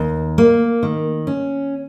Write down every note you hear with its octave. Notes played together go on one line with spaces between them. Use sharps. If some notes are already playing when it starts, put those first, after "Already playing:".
Already playing: D#2
A#3
D#3
C#4